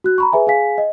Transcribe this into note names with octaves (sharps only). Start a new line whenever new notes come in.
F#4 F#6
A#5 B5 C#6
G#4 B4 E5 G#5
G#4 F5 G#5 B6
D#5